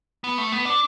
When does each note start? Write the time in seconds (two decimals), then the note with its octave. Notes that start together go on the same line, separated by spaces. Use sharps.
0.24 B3
0.38 A3
0.52 B3
0.65 D4